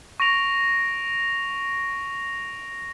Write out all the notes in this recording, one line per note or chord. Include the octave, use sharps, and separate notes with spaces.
C#6 A#6 D7 F7